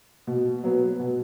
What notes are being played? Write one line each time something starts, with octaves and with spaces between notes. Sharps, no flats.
B2
F#3 B3
B2